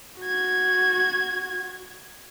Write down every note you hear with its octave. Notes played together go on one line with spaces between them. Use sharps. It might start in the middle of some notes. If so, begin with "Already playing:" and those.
F#4 G#6